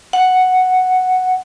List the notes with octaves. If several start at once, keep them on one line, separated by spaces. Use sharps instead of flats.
F#5